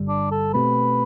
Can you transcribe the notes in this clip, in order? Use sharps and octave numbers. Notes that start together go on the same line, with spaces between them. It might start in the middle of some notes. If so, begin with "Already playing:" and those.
Already playing: G1 G2 D3 G3
D4
A4
B2 A3 C4 G4 B4